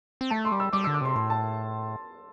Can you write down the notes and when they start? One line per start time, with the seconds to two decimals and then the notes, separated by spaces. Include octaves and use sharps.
0.21 C4
0.30 A3 A5
0.45 C6
0.52 G3
0.60 E6
0.73 G3 D6
0.84 D3 E6
0.94 D6
1.01 C3 C6
1.16 A2 C6
1.30 A5